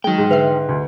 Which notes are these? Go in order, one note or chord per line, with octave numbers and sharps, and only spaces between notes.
F#3 G#3 D#4 G5
G#2
D3 B4 E5 C7
D2